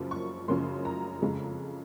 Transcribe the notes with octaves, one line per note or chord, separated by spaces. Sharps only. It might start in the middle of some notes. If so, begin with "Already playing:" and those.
Already playing: F#2 C#3 F3 A#3
C#6
F#2 C#3 F3 A#3 C6
A#5
F2 C#3 G#3